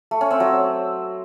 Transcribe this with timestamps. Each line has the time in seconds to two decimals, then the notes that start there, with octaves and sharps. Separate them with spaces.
0.11 A3
0.21 C#4
0.31 C4
0.40 F#3